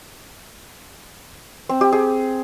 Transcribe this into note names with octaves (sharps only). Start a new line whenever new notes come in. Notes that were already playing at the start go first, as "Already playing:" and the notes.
C4
G4
G#4